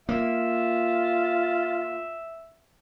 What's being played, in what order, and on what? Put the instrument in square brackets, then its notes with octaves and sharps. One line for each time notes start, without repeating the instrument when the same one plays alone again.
[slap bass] A#3 [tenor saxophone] F4 [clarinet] E5